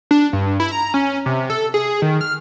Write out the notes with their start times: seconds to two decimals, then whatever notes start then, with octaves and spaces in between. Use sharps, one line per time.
0.11 D4
0.33 G2
0.60 E4
0.72 A#5
0.94 C#4
1.26 C3
1.50 A4
1.74 G#4
2.02 D#3
2.21 F6